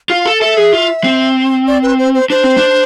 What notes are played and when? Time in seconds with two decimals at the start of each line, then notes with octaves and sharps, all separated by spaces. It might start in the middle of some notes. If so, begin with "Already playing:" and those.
0.10 F4 F5
0.25 A4
0.40 A4 E5
0.57 G#4
0.73 F4
1.04 C4
1.67 D5
1.82 B4
1.99 C5
2.14 C5
2.30 D4 C5
2.44 C4
2.58 D4